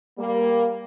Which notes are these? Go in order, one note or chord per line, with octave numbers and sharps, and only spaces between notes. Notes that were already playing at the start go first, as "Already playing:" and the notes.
G3 A#3